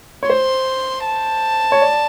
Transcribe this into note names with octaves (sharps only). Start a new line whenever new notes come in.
C#5
C5 C6
A5
C#5
D5